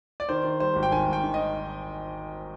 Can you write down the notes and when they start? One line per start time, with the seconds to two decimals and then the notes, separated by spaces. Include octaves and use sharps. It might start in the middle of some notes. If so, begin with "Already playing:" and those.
0.20 D5
0.29 D#3 C5
0.44 D#3
0.60 G3 C5
0.76 G#1
0.83 G5
0.92 D#3 G#5
1.07 G#1
1.13 G5
1.24 D#3
1.34 D#5